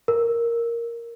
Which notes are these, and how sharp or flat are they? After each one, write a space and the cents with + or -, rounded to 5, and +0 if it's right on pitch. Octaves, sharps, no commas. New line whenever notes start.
A#4 +0